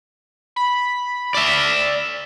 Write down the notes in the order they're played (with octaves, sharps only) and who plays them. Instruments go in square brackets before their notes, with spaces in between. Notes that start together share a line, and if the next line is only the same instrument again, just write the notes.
[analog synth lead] B5
[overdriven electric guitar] D5 E5